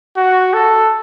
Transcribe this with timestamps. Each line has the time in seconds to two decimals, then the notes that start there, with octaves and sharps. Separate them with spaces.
0.17 F#4
0.53 A4